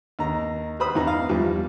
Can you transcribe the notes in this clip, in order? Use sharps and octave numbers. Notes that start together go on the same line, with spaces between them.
D#2 A#5
B4 C5 B5 D#6
E2 E3 D#4 A#5
F5
E2 F3 G3